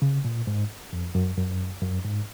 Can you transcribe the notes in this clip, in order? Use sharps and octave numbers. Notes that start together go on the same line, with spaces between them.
C#3
A#2
G#2
F2
F#2
F#2
F#2
G#2